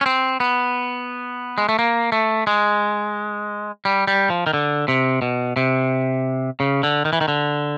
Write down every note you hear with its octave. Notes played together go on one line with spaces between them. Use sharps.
C#4
C4
B3
G#3
A3
A#3
A3
G#3
G3
G3
F3
D#3
D3
C3
B2
C3
C#3
D3
D#3
E3
D#3
D3